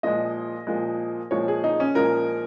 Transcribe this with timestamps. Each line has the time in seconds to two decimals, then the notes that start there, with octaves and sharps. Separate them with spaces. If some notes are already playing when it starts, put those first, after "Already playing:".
0.03 A#2 F3 G#3 D#5
0.67 A#2 F3 G#3
1.31 A#2 F3 G#3 C#5
1.48 G#4
1.64 D#4
1.80 C#4
1.95 A#2 F3 G#3 A#4